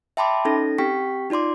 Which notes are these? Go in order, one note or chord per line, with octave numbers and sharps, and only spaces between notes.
E5 G5 A5 B5 C6 D6
C#4 D#4 A4 A#6
C4 G4 G5 C#6 B6
D#4 F4 D5 C6 D6